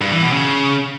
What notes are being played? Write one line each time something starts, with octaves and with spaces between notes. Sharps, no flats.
G2
E3
B2
C#3